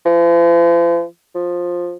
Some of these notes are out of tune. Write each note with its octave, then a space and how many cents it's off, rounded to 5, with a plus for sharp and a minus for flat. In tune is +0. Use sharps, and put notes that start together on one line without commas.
F3 -45
F3 +10